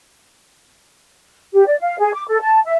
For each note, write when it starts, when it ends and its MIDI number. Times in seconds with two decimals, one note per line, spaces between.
1.54 1.65 67
1.66 1.76 74
1.81 1.98 77
2.00 2.11 68
2.14 2.24 86
2.29 2.40 69
2.41 2.61 81
2.65 2.76 76